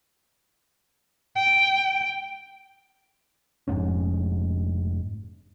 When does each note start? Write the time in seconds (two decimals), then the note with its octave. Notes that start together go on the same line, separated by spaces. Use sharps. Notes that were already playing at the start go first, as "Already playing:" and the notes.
1.36 G5
3.68 F1 F2 G#2 C#4